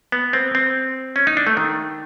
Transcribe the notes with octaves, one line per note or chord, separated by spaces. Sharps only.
B3
C4
C4
C#4
D#4
D4
A3
D#3